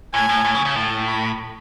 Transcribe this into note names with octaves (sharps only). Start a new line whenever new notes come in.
A2 G#5
A2
A2
C#3
C#3
A2 A5
B5